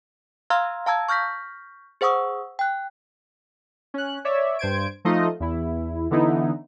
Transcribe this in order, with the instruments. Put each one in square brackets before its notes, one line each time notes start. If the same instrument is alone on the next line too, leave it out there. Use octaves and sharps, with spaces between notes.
[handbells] F5 A#5 C6 E6 F6 G#6
F5 A5 A#5 E6 G#6
C#6 F6 G6 A#6 B6
G#4 C5 F#5 C#6 D#6 E6
G5 F#6
[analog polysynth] C#4 F#6
C#5 D5 E5
G2 C5 G#6 D7
F3 A3 D#4 F4 D#5
E2 E4
D3 E3 B3 D#4 E4